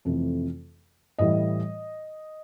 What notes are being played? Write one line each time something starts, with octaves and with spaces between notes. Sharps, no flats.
F2 C3 E3 A3
A2 E3 G3 D#5